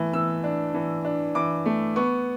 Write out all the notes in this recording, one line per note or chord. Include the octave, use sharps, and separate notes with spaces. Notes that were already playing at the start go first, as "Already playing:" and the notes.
Already playing: E3 A3
E3 E6
D4
E3
D4
E3 D6
A3
B3 C#6